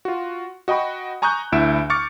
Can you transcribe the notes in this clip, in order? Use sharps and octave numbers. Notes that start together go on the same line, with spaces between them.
F4 F#4
F#4 D#5 G5 B5 C#6
G#5 A#5 C#6 D#6 F#6 G6
D2 E4 E5 D7 E7
C#6 D6 F6 A6 C#7